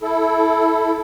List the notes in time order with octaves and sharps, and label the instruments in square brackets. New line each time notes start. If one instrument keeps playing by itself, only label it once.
[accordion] E4 A4